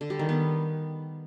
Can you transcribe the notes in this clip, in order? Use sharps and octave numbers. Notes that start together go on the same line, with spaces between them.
D3
G3
D#3
B3